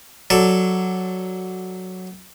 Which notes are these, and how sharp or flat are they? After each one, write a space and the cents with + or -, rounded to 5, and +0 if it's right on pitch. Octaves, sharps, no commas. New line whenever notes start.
F#3 +0 A4 +0 D5 +0